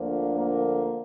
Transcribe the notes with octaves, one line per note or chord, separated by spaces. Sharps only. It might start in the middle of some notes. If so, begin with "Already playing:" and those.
Already playing: D2 D3 F3 A#3
A#3